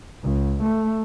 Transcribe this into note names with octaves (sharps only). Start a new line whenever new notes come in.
C#2
A3